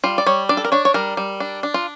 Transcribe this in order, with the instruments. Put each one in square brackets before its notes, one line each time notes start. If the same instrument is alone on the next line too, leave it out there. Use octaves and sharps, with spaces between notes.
[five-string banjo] G3 F4
D5
G3 C#5
D4 D5
A4
A#4
D4 C#5
C#5
G3 A#4
G3
D4
D4
F4